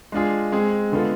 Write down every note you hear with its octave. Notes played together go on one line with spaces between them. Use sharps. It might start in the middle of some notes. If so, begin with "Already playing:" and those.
G#3 D4 F4 G#4
G#3 C4 G#4
D3 G#3 B3 F4 A4